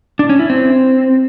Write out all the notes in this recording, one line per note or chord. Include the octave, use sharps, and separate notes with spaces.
D4
C#4
E4
C4